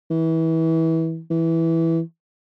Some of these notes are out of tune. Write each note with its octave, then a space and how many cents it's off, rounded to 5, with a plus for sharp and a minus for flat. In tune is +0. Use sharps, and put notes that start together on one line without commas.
E3 -25
E3 -5